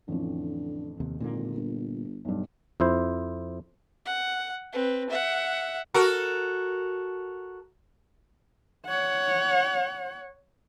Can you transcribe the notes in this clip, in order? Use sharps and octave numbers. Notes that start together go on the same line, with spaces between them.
A1 F2 D3
D#2 C3
G#1 A#2 D3 A#3
G1
B1 G2
F2 E4 C5
F#5
C4 B4
E5 F#5
F#4 A4 A#4
C#5 F#5